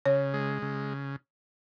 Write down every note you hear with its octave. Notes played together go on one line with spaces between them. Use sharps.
C#3 C#5
G#3
C#3